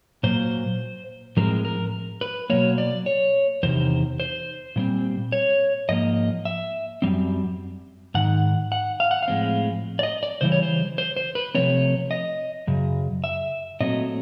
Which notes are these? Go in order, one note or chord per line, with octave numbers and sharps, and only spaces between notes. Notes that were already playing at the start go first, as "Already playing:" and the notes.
A#2 F#3 A#3 C5
A2 F3 G#3 C4 A#4
A#4
B4
B2 F#3 A#3 C#5
D5
C#5
E2 C3 D#3 C5
C5
A#2 G3 C4
C#5
G#2 F3 A#3 D#5
E5
F#2 D3 G3 C4
G#2 D#3 F#5
F#5
F5
F#5
F5
A2 F3 G#3 C4
D5
D#5
D5
C#3 E3 G3 C5
C#5
C5
C5
C5
B4
C3 F3 A3 C4 C#5
D#5
F#2 C#3
E5
A#2 F#3 A3 C4 D#5